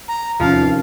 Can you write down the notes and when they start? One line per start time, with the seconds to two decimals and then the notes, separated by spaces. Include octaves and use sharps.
0.08 A#5
0.40 E2 C3 D#3 F3 C#4 F4 F5